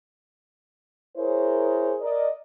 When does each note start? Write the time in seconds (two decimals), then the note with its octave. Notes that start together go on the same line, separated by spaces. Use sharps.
1.17 E4 G#4 A#4 C5 C#5
2.01 A#4 D5 D#5